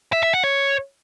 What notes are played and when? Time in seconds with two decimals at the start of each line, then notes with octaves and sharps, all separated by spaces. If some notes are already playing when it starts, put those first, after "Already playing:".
0.13 E5
0.23 E5
0.33 F#5
0.44 C#5